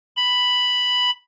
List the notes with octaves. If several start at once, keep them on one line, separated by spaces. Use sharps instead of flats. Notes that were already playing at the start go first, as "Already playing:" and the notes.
B5